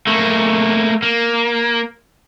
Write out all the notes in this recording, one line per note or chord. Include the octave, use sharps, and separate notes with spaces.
A3 A#3
A#3